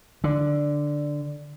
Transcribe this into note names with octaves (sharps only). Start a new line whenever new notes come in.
D3